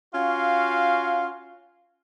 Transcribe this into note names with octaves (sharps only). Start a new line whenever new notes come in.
C#4 F4 F#4 F5